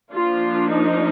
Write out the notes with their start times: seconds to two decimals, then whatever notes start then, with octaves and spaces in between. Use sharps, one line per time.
0.12 F3 A#3 D4 F4
0.68 D#4